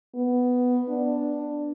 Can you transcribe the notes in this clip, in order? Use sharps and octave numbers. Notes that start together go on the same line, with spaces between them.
B3
D4